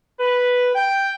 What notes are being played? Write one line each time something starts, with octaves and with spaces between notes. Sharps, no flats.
B4
G5